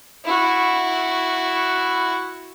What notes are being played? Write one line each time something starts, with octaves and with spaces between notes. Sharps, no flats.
E4 F#4